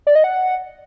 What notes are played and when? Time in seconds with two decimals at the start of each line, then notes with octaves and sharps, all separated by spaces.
0.07 D5
0.15 D#5
0.24 F#5